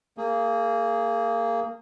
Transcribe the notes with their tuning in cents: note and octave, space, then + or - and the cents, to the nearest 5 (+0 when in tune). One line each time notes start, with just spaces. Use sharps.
A#3 -20 G#4 +0